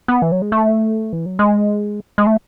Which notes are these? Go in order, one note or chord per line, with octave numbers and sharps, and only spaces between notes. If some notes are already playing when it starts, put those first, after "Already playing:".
B3
E3
F#3
G#3
A3
E3
F#3
G#3
G#3
A3